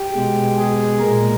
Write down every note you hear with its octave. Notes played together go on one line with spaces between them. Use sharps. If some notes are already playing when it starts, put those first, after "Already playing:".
Already playing: G4
B2 G#3
G#4
A#2 G#3 A#4